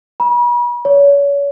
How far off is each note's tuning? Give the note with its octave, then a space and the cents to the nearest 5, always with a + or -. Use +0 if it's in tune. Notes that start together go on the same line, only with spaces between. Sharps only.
B5 -40
C#5 +35